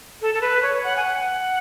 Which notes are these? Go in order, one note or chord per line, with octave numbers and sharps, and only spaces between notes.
A4
A4
B4
C#5
F#5
G#5
F#5